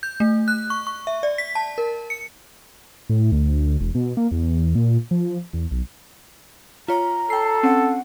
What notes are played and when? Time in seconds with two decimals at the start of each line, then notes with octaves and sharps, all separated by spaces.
0.03 G6
0.20 A3
0.48 F#6
0.70 C#6
0.87 C#6
1.07 E5
1.23 D5
1.38 B6
1.55 A5
1.78 A#4
2.10 C#7
3.09 A2
3.32 D2
3.80 E1
3.95 B2
4.17 A#3
4.31 E2
4.75 A#2
5.11 F3
5.53 E2
5.71 B1
6.88 F4 C#5 A#5
7.30 A4 G5 C7
7.63 C4 C#4 F#5